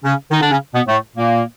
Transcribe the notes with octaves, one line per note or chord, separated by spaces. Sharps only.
C#3 C#4
D#3 D#4
D3 D4
C#3 C#4
B2 B3
A2 A3
A#2 A#3